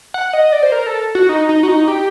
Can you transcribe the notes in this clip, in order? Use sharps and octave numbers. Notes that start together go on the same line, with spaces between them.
F#5
D#5
D5
C5
A#4
A4
F#4
D#4
D#4
F#4
D#4
G4